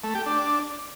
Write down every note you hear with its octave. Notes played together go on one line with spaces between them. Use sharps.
A3
G4
D4